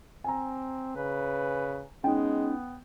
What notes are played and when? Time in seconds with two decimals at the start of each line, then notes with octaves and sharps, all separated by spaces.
0.24 C4 G#5 A#5
0.96 C#3 B4
2.04 G#3 B3 C#4 D#4 G5